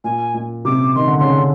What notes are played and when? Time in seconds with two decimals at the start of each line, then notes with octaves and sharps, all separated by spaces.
0.04 A#2 G#5
0.34 A#2
0.65 C3 D6
0.95 D#3 C6
1.08 D3
1.19 C#3 C6
1.32 D3